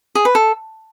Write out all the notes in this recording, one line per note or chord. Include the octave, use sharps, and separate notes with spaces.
G#4
B4
A4